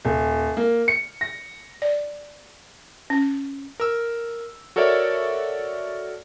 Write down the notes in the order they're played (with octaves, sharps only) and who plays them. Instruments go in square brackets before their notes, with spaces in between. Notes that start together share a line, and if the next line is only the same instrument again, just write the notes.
[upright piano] D#1
A#3
C#7
A#6
[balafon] D5
C#4
[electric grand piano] A#4 E6
F#4 A4 A#4 C#5 D5 E5